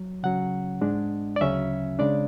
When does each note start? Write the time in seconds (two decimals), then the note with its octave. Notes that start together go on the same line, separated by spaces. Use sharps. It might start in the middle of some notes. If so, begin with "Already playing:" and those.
Already playing: F#3
0.23 C#3 F#3 C#4 F#5
0.81 G#2 G#3 D4
1.36 D5
1.41 D2 C#3 F#3 C#4 E5
1.99 C#3 G#3 D4 D5